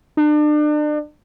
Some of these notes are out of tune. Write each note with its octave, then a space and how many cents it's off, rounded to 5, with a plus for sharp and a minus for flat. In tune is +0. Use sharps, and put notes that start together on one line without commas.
D4 +35